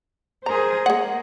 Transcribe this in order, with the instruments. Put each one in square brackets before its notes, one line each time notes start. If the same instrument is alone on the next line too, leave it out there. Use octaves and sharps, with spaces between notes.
[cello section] G#4 A#4 C5 [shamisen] A#5
[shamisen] G#3 F#5 [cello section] A#3